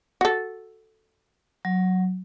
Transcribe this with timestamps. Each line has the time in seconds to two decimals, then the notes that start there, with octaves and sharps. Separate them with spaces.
0.21 F#4 A4
1.65 F#3